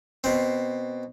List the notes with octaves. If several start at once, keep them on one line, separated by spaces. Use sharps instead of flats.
B2 C4